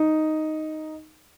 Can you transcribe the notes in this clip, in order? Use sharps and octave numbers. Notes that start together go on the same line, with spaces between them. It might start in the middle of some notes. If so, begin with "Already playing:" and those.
Already playing: D#4